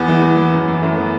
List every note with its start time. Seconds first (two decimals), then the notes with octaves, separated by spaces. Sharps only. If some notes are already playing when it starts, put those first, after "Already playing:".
Already playing: E2 B3
0.08 E3
0.22 E2
0.37 E3
0.53 F#2
0.68 E3
0.82 F#2 A3
0.97 E3 B3